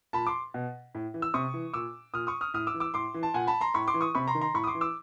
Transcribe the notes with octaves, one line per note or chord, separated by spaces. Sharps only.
A#2 A5 B5
C6 D6
B2
A2
E3
E6
C3 C#6 D#6
E3
A#2 D6 E6
A#2 D#6 F6
C#6 D#6
D#6 F6
A2 D#6 F6
D6 E6
E3
D6 E6
A2 C6 D6
E3
A5
A#2 F#5 G#5
A5 B5
A#5 C6
A2 B5 C#6
C6 D6
E3
C#6 D#6
C3 B5 C#6
A#5 C6
D#3
A#5 C6
A2 B5 C#6
D#6
C6 D6
E3
D6 E6